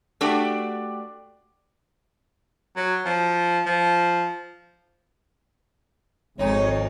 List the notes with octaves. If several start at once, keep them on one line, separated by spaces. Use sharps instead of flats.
A3 D4 F#4 G4 D5
F#3
F3
F3
G#1 F2 D#4 C#5